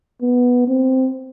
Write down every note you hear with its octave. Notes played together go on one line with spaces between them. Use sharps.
B3
C4